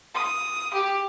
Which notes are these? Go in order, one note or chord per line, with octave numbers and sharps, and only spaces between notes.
D#6
G4